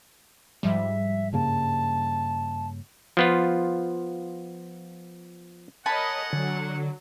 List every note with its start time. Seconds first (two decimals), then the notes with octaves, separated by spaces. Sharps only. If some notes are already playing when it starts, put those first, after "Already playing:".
0.63 G#2 F3 G3 E5
1.33 G2 C#3 A#3 A5
3.17 F3 B3 F4
5.86 A#4 C#5 D#5 F#5 G#5 A5 B5
6.33 D3 F#3